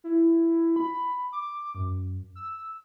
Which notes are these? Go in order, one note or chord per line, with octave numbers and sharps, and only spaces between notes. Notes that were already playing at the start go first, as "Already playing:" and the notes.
E4
B5
D6
F#2
E6